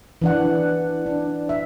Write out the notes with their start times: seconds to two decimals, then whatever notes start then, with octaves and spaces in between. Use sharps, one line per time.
0.22 E3 D4 F#5
1.06 D4
1.49 E5